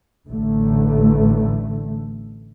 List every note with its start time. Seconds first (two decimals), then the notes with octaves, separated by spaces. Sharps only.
0.27 A1 D3 A3